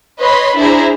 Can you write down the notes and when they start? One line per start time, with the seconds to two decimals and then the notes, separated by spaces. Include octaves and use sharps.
0.19 B4 C#5 D#5 B5 C6
0.58 D4 E4 G#4 C5 A#5